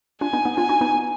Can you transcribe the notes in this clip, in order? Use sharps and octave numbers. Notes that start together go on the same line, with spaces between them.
D4 F4 G#5
B3 D#4
B3 D#4
D4 F4 G#5
D#4 F#4
B3 D#4